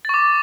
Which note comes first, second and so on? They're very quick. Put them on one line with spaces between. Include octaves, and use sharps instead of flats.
A6 C#6 D6